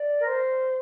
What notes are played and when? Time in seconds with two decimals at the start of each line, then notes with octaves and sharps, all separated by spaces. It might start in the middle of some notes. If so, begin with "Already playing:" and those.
Already playing: D5
0.18 A#4
0.25 C5